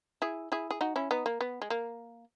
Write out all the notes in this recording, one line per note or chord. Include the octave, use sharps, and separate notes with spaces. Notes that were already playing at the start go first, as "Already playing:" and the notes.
E4 G#4
E4 G#4
G#4
D#4 F#4
C#4 E4
B3 D#4
A#3
B3
G#3
A#3